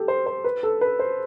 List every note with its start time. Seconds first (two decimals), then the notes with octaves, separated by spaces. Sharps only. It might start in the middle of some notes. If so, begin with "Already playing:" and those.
Already playing: G4 A4
0.08 C5
0.26 C5
0.44 B4
0.63 A4
0.81 B4
0.99 C5